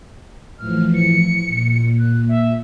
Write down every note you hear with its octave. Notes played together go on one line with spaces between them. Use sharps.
A2 E3 F3 F6
C#7
A#2
F#6
E5